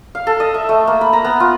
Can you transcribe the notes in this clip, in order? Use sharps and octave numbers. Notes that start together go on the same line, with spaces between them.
F5
A4
D#5
E5
A3
A#3
B5
A#5
B3
F4